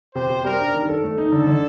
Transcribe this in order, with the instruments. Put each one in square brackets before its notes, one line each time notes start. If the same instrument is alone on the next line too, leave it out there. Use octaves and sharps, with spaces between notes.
[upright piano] C3 [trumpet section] C5
[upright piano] C3
[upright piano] G3 [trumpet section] A#4
[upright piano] D4
D#3
A4
A3
D#4
[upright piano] D3 [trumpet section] A4
[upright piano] D3